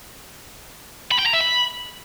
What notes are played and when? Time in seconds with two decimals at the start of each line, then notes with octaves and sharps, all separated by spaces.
1.12 B5
1.19 G5
1.26 A#5
1.34 E5
1.41 B5